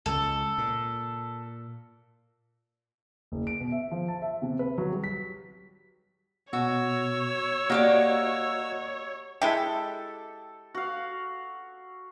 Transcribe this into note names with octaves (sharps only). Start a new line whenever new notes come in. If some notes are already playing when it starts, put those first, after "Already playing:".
C#2 A4
A#2
F#1
D7
B2
E5
F3
A5
E5
C3
B4
F#3
G3
B6
B2 F#4 C#5 E6
A#3 F#4 G4 D5 D#5 F#5
G#3 E4 G4 A4
F#4 F5